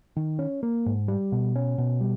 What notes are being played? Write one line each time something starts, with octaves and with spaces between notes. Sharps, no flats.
D#3
C#4
A#3
G#2
G3
B2
C#4
B2
G3